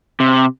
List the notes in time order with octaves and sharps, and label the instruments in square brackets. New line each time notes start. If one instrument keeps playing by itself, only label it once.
[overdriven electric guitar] C3